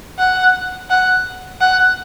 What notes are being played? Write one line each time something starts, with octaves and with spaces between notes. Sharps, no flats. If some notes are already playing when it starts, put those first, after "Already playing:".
F#5
F#5
F#5